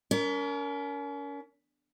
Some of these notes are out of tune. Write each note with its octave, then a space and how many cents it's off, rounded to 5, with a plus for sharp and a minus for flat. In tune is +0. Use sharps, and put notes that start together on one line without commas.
C#4 +40 A#4 +0